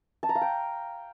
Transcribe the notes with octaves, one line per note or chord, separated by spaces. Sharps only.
A5
A#5
F5
G5